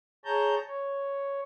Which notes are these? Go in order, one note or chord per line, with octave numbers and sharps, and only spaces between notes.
G#4 C#5 A5 A#5 G6
C#5